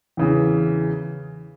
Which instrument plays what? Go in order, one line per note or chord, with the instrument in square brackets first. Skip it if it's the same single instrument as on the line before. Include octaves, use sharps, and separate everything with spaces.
[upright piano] E2 C#3 E3